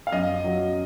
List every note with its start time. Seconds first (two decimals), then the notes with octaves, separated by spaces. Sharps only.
0.07 F5
0.12 F#2 D#5
0.44 F#3